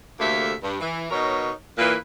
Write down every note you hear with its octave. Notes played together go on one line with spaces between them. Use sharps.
D2 C3 A3 A#3 E5
G2
E3
B2 D#4 A#4 C#5
A#2 E3 A#3 B4